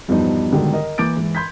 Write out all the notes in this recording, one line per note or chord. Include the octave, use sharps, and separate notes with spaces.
E2 G2 B2 F3 B3 D#4
G#2 B2 D3 D#3 F#3 G3
A#4 D#5
E3 A#3 D6 G6 A6 D7
G#2 E3
B5 C6 G6 G#6 B6